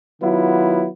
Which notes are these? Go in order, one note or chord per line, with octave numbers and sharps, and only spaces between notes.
D#3 F#3 B3 E4 F4